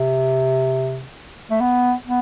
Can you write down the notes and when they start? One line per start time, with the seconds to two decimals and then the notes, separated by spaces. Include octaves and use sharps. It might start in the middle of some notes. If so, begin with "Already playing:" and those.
Already playing: C3
1.50 A3
1.60 B3
2.06 B3